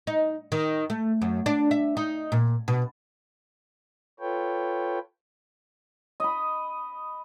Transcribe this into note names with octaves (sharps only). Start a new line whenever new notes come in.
D#4
D#3
A3
F#2
D4
E5
D#4
A#2
B2
F4 A4 B4 C#5 G5
D#5 B5